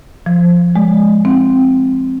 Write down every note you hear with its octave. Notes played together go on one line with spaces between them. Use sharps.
F3
G#3
C4